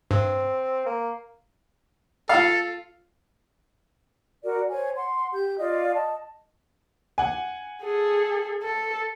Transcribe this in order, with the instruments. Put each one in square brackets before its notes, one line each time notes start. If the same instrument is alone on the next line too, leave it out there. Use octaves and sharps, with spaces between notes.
[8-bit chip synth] G2 [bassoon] C4
[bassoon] A#3
[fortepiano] F4 F5 [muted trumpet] A4
[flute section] F#4 A#4 D5
C5 C#5 G#5
F#5 C6
G4 G6
F4 D5 D#5 F5
D#5 A5
[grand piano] F#5 G#5
[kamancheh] G#4 A4
A4